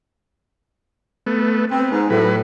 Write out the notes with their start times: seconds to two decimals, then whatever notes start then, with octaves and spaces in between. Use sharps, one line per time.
1.27 A3 B3
1.71 B3 C4
1.92 G#2
2.10 A2 F#3 B4